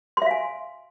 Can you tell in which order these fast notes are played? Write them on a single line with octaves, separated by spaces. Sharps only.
C6 E5 F5 G#5